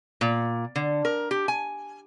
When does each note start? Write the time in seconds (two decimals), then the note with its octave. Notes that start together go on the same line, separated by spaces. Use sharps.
0.21 A#2
0.76 D3
1.05 A#4
1.31 G4
1.48 G#5